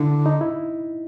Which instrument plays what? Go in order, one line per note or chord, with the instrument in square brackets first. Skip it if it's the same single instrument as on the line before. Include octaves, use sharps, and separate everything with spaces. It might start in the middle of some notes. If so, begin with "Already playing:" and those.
Already playing: [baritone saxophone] D3 [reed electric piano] E4
[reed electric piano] D#4
E4